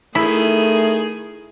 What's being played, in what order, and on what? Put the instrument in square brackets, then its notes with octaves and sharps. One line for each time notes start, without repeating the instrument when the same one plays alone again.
[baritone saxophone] D#3 [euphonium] A3 [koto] E4 [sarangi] G#4